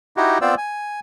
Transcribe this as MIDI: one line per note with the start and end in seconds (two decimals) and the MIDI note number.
0.17 0.38 63
0.17 0.38 64
0.17 0.38 66
0.17 0.38 67
0.41 0.55 59
0.41 0.55 60
0.41 0.55 65
0.41 0.55 72
0.41 0.55 74
0.41 0.55 88
0.58 1.00 80